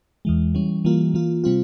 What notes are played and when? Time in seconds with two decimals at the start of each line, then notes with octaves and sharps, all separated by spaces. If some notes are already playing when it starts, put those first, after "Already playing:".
0.25 E2 E3 G#3
0.55 E3 G3 C#4
0.85 E3 G3 A#3 F4
1.14 E3 A#3 F4
1.44 C3 G3 C4 F4